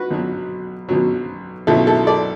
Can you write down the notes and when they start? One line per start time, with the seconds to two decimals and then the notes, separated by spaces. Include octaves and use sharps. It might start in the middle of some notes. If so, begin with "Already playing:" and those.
Already playing: F#4 B4
0.10 B1 B2 F#3
0.89 B1 B2 F#3
1.67 B1 B2 F#3 E4 A4
1.87 E4 A4
2.07 A4 D5